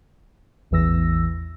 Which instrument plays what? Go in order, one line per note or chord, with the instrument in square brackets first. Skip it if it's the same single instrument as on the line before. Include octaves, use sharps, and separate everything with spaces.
[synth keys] A1 E2 E3 E6 A#6